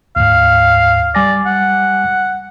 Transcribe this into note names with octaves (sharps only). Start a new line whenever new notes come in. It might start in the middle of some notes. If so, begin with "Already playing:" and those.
D2 G#2 F5
G3 D5 G#5 A#6
F#5